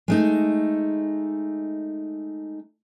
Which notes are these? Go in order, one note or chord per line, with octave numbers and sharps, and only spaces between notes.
G#3 A3 D#4